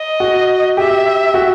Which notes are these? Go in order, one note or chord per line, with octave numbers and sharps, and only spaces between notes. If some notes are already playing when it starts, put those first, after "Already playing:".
Already playing: D#5
F#4
G4 E5
F#4